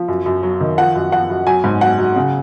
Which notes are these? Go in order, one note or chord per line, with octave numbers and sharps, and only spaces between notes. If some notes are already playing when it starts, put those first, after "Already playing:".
Already playing: F3
F#2
F#2
F#3
D#3
F3 F#5
F#2
F3 F#5
F#2
F#3 G#5
G#2
F#3 F#5
F#3
C#3